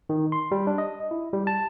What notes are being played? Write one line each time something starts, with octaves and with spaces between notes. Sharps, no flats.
D#3
C6
G3
D4
D#5
E4
G3
A5